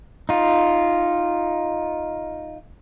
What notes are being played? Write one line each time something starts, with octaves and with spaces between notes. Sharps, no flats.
D#4 F4